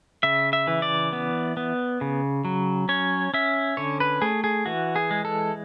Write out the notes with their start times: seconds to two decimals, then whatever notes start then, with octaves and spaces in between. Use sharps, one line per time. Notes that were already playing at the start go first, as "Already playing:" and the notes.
0.23 C#3 E5
0.53 E5
0.67 E3
0.82 D5
1.13 B3
1.57 B3
2.01 C#3
2.45 F#3
2.89 C#4 C#5
3.34 C#4 E5
3.77 D3 C#5
4.00 B4
4.22 A3 G#4
4.44 G#4
4.66 E3 F#4
4.96 G#4
5.11 G#3
5.25 A4